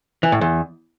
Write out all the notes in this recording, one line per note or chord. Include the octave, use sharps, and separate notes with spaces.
E3
A2
E2